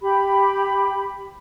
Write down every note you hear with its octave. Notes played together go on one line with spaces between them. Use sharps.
G4 B5